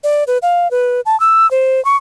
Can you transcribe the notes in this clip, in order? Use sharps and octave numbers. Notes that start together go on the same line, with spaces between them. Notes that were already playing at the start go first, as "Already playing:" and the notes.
D5
B4
F5
B4
A5
E6
C5
C#6